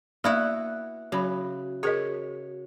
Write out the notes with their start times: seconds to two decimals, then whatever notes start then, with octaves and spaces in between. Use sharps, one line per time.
0.24 A#3 B3 E4 F#4 D5
1.12 C#3 F#3 F#4 B5
1.83 G#4 A#4 C#5 D#5